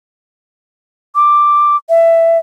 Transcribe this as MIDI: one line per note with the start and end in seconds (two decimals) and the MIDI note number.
1.15 1.76 86
1.89 2.38 76